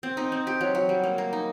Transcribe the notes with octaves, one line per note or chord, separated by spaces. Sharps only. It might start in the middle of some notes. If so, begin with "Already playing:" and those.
C4
D#4
C4
G4
F#3
F#3
G3
A#3
A#3
D#4